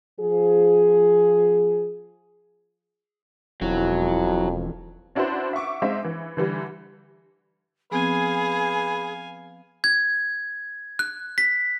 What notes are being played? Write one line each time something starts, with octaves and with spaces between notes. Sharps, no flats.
F3 G#4
E1 F2 F#3 E4
C#4 D4 E4 F#4 B4 C5
E5 F#5 C#6 D6
G#3 C4 D#4 C5 E5 F5
E3
D3 E3 G3
F3 B3 C4 G#4 B4 F5 G#5
G#6
F#6
B6